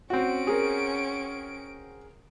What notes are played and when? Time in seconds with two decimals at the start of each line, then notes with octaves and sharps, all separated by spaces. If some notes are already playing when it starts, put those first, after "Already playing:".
0.10 C4 C#4 F#4 D7
0.47 G#4 A#4